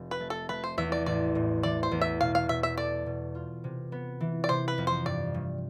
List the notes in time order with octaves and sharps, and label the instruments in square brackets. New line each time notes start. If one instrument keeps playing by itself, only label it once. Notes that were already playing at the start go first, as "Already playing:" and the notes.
Already playing: [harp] F1
[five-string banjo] B4
[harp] A3
[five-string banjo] A4
[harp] A3 [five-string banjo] B4
[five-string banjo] C5
[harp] E2 [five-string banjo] E5
[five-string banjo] D5
[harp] A1 [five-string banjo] D5
[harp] A2
[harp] E3 [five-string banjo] D5
[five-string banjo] C5
[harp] E2
[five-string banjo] E5
[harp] B2 [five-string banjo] F5
[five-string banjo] F5
[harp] B2 [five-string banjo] E5
[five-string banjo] E5
[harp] A4 [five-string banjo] D5
[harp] B2
F4
C3
B3
E3
[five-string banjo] D5
[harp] C3 [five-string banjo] C5
[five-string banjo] B4
[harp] F2
[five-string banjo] C5
[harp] G2 [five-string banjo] D5
[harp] G2